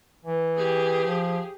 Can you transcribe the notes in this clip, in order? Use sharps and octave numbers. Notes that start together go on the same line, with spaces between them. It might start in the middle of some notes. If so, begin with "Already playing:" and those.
E3
G4 G#4
F3